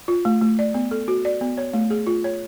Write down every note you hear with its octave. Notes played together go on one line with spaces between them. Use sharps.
F4
A3
A3
D5
B3
A4
F#4
D5
B3
C#5
A3
G#4
F4
C#5